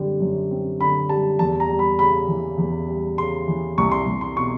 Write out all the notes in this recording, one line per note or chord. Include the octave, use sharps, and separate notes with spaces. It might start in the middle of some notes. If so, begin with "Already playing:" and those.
Already playing: F#2 D3 G3 C4
F#2
C4
D3 B5
G3 A5
E2 A5
A#5
G3
B5
C#3 B5
E3
E2
G3
C#3 C6
E3
C2 C#6
C6
C2
C6
B2 C#6